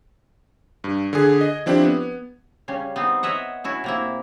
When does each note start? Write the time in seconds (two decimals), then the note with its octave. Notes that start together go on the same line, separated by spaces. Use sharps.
0.84 G2
1.13 D3 G#4 G#6
1.41 D#5
1.66 F3 C4 D4 E4 G4
1.84 B3
2.68 C#3 G3 C#4
2.96 B3 C4 D#4
3.23 C#5 D#5 E5 F#5
3.64 C#4 E4 F#4
3.84 C3 A#3 E4